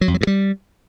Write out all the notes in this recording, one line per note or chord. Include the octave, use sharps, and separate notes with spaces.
F#3
F2
F#3
G2
G3